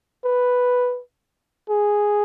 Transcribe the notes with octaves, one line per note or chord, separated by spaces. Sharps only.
B4
G#4